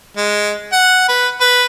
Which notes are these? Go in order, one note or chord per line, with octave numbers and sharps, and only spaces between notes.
G#3
F#5
B4
B4